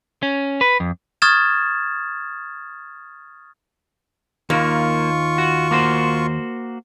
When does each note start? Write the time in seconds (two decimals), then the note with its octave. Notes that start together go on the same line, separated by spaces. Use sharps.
0.23 C#4
0.61 B4
0.80 F2
1.22 C#6 D#6 F6 G#6 A6 E7
4.50 D#2 A#3 F4 C#6
5.38 F#4
5.71 A#3 F#4 C5